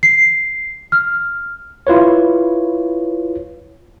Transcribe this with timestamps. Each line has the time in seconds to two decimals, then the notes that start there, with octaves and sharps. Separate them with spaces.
0.03 C7
0.92 F6
1.87 E4 F4 B4 C#5